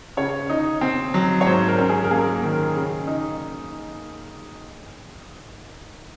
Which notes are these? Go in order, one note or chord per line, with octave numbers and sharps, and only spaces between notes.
C#3 C#5
D#4
C4
F#3
C#5
G#2 C5
A#4
C#4
G#4
A#4
A#3 G#4
D#3
C#3
D#4